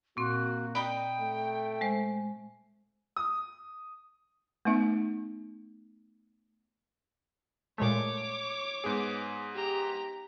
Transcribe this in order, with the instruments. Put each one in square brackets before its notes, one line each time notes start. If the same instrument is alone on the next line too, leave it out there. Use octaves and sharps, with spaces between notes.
[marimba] A#2 C4 [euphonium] A#3 [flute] F#4
[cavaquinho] D#4 D#5 B5 [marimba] D5 [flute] G5
[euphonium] A3
[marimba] G#3 C5
[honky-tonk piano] D#6
[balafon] A3 B3 D#4 E5
[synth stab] A#2 G#3 A3 [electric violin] C#5 D6
[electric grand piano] G#2 B3 G#4
[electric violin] G4 A#5